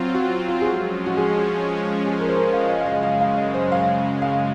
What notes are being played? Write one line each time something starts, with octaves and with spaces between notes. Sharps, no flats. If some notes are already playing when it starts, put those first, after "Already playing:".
Already playing: F#3 C4 F4
F#4
F4
G#4
F3 G#3 C#4 F#4
F#4
G#4
G#4
A#4
C5
A#4
F5
F#2 C#3 G#3 D#5
F5
D#5
F5
F5
D#5
C5
F5
F5